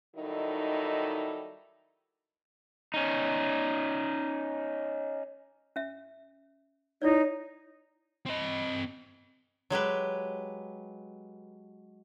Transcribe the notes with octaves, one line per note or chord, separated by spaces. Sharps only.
D#3 F#3 G3 D#4 E4 A4
C#4 D#4
C#4 E5
D#4 E4 C#5 D5
C4 D#5
F#3 G#3 G4 B4